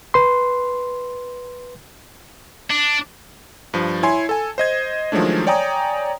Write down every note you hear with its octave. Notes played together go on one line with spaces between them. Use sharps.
B4 C6
D4
G2 F3
E4 C#5 G#5 C6
A4 G#5
C5 D#5 G#6
D#3 F3 F#3 G#3 A3 D4
C#5 D5 G5 G#5 A#5 D#6